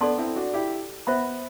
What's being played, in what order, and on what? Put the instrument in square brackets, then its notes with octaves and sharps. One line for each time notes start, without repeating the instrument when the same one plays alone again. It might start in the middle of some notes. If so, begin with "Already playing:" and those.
[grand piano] B3 D4 [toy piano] A4 D5 A5 C6
[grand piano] C4 E4
D4 F#4
E4 G4
[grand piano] B3 [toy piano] C5 E5 B5